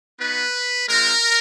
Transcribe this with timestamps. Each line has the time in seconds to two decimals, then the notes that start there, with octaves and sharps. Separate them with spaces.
0.19 B3 D#4 F#4 B4
0.88 G#3 C4 F4 A#4